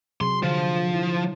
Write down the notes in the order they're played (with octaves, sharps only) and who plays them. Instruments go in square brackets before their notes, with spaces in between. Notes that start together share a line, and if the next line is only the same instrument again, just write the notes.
[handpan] C3 F#3 G#4 [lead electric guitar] C6
[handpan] D3 [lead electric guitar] F3
[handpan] E4